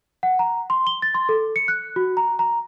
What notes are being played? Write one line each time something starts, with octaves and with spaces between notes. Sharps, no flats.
F#5
A#5
C6
G7
A6
C6
A4
C#7
F#6
F#4
A#5
A#5